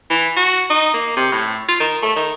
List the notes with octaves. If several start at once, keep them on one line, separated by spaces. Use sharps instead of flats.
E3
F#4
D#4
A#3
C3
A2
F4
D#3
A3
D#3